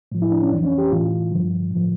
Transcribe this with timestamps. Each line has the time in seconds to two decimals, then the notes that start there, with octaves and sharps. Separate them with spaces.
0.12 A2 F3
0.22 E4
0.32 D4
0.42 C#4
0.51 F2 E3 D4
0.65 C#4
0.78 G4
0.91 A2 E3 F4
1.31 G2 D3 F3
1.71 A2 F3